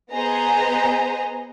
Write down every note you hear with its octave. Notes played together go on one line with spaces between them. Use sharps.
B3 G#4 C5 D#5 A#5